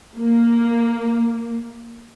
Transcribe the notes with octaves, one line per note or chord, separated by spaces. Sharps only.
A#3